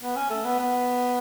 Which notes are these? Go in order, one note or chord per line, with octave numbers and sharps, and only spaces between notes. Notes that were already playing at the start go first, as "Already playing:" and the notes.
B3
C#4
A3
B3
B3